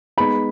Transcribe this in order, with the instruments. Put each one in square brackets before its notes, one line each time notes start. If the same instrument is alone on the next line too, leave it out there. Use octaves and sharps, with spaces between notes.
[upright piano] G#3 B3 D#4 [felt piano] B5